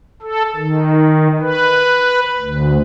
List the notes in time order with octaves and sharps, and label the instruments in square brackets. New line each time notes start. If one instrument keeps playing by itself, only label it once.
[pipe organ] A4
D#3
B4
D2